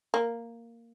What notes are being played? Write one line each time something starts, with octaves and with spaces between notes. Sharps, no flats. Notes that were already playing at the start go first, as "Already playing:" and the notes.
A#3